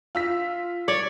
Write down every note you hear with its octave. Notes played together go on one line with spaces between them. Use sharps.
F4 E6 B6
C#5 D5